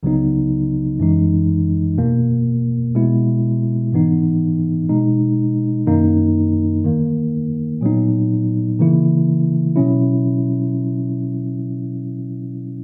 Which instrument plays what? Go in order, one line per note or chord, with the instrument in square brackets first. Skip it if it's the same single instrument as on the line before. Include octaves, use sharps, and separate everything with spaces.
[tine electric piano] C#2 C#3 F#3 B3 D#4
F#2 E3 G#3 D#4
E2 B2 A#3
B2 G#3 B3 E4
G#2 E3 B3 D#4
B2 G#3 D#4
F#2 D#3 A#3 D#4
E2 D#3 A#3
A#2 F#3 B3 D#4
C#3 E3 A#3 E4
B2 F#3 C#4 E4